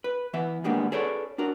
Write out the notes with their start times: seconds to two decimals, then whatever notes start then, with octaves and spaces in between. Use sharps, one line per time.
0.04 B4
0.33 E3 B3 E5
0.64 D#3 G3 G#3 A#3 B3 D4
0.92 G#4 A4 B4 C#5 D5
1.38 D4 F#4 A#4